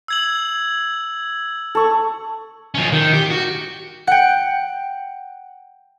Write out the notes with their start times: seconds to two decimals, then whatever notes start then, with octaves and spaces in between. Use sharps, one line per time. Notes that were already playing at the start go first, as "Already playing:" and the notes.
0.08 E6 G#6 F#7
1.75 A4 C#6
2.75 F3 C#4
2.93 D#3
3.13 G4
3.31 F#4
4.07 F#5 G5